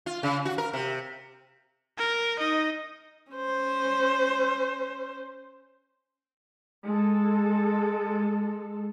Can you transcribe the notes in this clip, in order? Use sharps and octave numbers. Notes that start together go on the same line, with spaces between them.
F4
C#3
F#4
A#4
C3
A#4
D#4 D#5
C#4 C5
G#3 A4